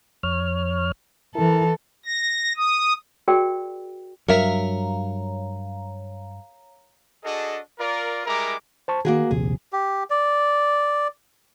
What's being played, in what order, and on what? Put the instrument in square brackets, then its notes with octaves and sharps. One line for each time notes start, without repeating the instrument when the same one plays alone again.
[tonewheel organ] F2 C#5 F6
[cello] E3 A4 [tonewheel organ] E4 A#4
[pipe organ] A#6
D#6
[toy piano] F#4 G#4 A#4 D5 G5
[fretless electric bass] G2 F#3 [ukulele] A#4 E5 [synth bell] C#5 F5 A#5
[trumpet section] D4 F#4 G#4 A4 D#5
F4 A#4 D5
G3 G#3 E4 A#4 A#5 D6
[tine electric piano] C5 A5 C#6
[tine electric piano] D#3 [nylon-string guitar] A#3 F#4 G#4
[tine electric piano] A#1 D#2 C3 [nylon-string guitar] G#4
[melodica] G4
D5